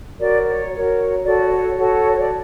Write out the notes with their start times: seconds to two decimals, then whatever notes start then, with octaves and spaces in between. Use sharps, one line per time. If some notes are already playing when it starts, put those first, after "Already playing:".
0.19 F#4 A#4 C#5 D5
0.46 C#5
0.73 F#4 A#4 C#5
1.25 F#4 A4 C#5 D5
1.51 C#5
1.77 F#4 A4 C#5
2.12 C#5
2.20 D5